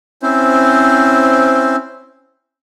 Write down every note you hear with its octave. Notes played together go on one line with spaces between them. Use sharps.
C4 C#4 E4 C5